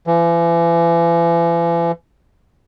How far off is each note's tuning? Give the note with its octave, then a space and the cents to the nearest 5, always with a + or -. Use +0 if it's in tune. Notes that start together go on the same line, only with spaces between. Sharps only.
E3 +40